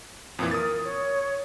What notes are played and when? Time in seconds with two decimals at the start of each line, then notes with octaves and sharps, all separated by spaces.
0.39 F2 A#2 E3 D#6
0.51 A#4 D#6 A6
0.85 C#5